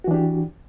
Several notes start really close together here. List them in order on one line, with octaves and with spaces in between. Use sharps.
F#4 E3 D4 G4